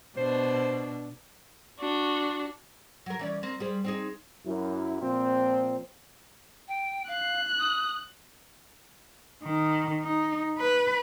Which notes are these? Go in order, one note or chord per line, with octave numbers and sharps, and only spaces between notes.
B2 D4 C5
D4 F#4
F#3 A#4
E3 C#4 D5
A#3 C4
G3 G#4 C5
C4 D#4 G#4
F#2 E4
A#2 F3 C4
G5
F5 F#6
D#6
D#3
D#4
B4